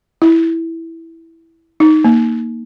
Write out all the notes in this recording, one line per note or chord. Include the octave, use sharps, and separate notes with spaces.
E4
D#4
A#3